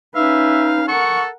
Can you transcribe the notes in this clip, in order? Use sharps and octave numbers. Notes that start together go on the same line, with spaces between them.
C#4 D#4 B4 E5 F5
A4 A#4 F#5 C#6